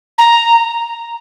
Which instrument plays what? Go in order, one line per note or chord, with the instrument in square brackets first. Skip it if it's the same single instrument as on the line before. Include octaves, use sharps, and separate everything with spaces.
[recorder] A#5